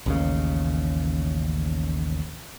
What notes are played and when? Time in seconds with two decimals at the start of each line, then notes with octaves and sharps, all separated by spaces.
0.06 A1 D#2 C#3